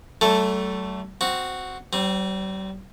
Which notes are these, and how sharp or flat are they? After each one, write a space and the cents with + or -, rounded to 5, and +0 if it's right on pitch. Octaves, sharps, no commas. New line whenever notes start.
F#3 +45 A3 +0 A4 +0
C4 -5 F#4 +0
G3 -40 C4 +0